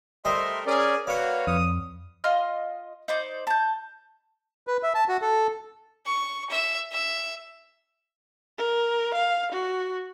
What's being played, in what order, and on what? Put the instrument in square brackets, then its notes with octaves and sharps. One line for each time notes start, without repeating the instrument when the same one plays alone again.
[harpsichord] G3 C5 D#5 [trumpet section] A3 A#4 [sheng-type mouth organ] E5 C6
[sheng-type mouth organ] C#4 A#4 D5 [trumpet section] G#4
[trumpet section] A#3 F#4 [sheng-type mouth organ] B4 C#5 F5 [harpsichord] D5 F#5
[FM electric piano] F2 [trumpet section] D#6
[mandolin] F4 D#5 C6 F6
D#4 C5 D5
A5 G6
[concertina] B4
E5
A5
F#4
A4
[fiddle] C#6
E5
E5
[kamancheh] A#4
F5
F#4